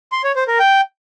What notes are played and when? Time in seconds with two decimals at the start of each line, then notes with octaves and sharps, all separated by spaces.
0.12 C6
0.24 C#5
0.36 C5
0.48 A#4
0.59 G5